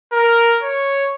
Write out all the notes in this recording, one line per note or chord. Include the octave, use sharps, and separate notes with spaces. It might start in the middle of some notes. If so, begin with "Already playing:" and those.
A#4
C#5